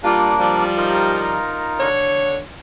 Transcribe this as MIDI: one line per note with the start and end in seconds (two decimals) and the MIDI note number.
0.03 0.34 55
0.03 0.65 58
0.03 0.65 62
0.03 0.34 65
0.39 1.35 53
0.39 1.35 55
0.77 1.88 63
0.77 1.88 65
0.77 1.88 70
1.80 2.38 50
1.80 2.38 73